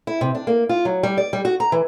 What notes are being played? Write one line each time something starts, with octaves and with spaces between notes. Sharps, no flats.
E4
C3
D4
A#3
F4
F#3
G3
D5
G3
F#4
A#5
E3